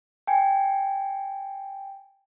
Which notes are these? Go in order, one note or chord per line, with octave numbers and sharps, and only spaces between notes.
G5 G#5